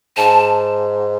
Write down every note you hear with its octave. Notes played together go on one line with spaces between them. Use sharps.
G#2 A5